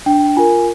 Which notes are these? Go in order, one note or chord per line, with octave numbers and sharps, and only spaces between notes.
D4 G5
F4 A#4 G#5